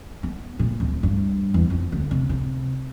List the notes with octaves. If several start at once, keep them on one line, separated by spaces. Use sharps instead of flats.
B3
A#2
D1
G2
E2
F2
D2
C3
C3